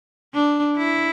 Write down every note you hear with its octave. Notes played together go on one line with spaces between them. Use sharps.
D4
E4